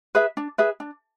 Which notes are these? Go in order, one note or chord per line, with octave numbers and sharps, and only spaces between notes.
G#4 B4 E5
D4
G#4 B4 E5
D4